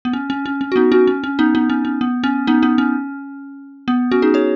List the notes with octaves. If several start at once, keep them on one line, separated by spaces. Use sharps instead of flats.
B3
C#4
C#4
C#4
C#4
F#4
B3 D#4
C#4 F#4
C#4
C#4
B3 D#4
B3 D#4
C#4
C#4
B3
C#4
B3 D#4
B3 D#4
C#4
B3
C#4 F#4
D#4 G#4
G#4 C#5